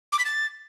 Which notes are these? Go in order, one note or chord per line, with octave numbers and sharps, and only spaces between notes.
D6
B6
A6